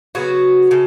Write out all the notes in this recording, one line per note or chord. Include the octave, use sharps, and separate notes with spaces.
C#3 F#3 B3 F#4
C#3 A3